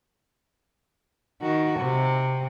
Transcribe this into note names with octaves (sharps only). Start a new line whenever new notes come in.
D#3 F#4
C3